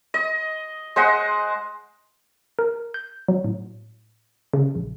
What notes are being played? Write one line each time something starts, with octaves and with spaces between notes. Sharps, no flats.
D#5
G#3 C5 D#5 F#5
A#4
G6
F#3
A2
C#3
A#1